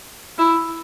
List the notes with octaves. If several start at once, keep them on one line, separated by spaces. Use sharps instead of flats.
E4